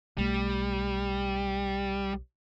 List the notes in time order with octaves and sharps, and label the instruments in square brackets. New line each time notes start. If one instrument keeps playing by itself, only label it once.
[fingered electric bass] B1 A3 [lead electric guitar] G3